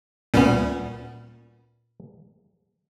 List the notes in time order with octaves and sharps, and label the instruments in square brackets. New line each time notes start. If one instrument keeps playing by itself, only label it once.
[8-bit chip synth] D2 G3 C#4 [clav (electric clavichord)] A#2 B3